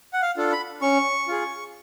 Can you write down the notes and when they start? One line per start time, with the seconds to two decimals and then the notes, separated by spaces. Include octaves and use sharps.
0.13 F#5
0.22 F5
0.37 D4 F4 A4
0.52 B5
0.82 C#4 C#6
1.28 F4 G#4